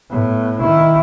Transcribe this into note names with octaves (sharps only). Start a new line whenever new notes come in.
A2 B3
D#3 E4